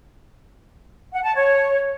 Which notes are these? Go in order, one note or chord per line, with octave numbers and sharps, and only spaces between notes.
F#5
A5
C#5